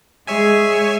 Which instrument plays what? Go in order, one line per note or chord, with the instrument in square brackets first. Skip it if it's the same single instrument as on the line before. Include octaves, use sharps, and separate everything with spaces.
[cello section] G#3 G#4 [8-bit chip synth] C#5 E5 G#5